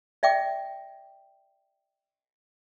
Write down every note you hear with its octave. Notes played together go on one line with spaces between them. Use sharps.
D5 E5 G5 D6